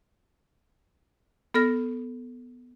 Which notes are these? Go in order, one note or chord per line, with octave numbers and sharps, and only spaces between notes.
B3 A4 F6 A#6